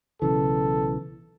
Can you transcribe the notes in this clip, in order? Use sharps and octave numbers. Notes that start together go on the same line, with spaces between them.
B1 C#3 E3 A4